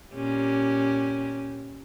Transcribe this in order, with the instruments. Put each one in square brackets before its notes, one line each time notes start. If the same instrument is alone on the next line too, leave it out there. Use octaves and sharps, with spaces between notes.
[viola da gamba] A#2 C#4 G4